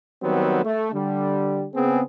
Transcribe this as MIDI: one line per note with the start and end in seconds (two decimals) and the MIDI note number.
0.23 0.62 51
0.23 0.62 54
0.23 0.62 55
0.23 0.62 59
0.23 0.62 60
0.64 0.92 57
0.93 1.66 50
0.93 1.66 55
1.74 2.02 49
1.74 2.02 59
1.74 2.02 60
1.74 2.02 68